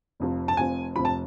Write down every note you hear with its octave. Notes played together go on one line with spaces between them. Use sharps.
F1 F2 F3
A5
F1 F2 F3 G#5
F1 F2 F3 B5
A5